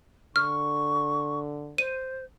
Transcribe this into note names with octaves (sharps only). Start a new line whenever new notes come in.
D3 C#6 F6
C5 D#7